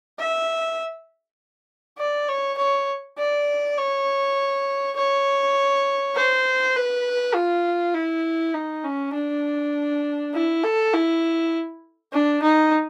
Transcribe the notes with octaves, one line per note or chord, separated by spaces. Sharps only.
E5
D5
C#5
C#5
D5
C#5
C#5
C5
B4
F4
E4
D#4
C#4
D4
E4
A4
E4
D4
D#4